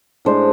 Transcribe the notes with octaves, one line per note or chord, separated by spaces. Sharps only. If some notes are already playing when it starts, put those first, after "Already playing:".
A2 G#3 D4 C5